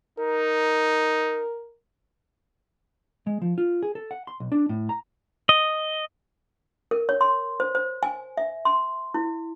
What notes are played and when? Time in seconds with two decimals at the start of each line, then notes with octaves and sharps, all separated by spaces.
0.19 D#4 A#4
3.27 G#3
3.42 F3
3.58 F4
3.83 G#4
3.95 A4
4.11 F#5
4.27 C6
4.40 B1
4.52 D4
4.69 A2
4.89 A#5
5.49 D#5
6.91 A#4
7.09 C#5
7.21 C6
7.60 C5
7.75 C5
8.03 G#5
8.37 E5
8.65 C6
9.14 E4